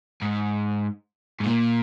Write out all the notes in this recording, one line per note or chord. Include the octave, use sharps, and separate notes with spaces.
G#2
G#2
A#2